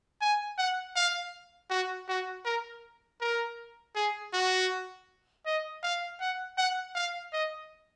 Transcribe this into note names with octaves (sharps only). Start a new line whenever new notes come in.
G#5
F#5
F5
F#4
F#4
A#4
A#4
G#4
F#4
D#5
F5
F#5
F#5
F5
D#5